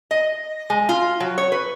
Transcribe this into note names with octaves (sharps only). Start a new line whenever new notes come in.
D#5
G#3
F4
F#3
C#5
B4